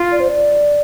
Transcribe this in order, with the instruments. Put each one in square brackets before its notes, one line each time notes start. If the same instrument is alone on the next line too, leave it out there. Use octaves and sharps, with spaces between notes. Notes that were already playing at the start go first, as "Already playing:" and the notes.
Already playing: [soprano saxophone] F4
[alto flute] D5
C5
D5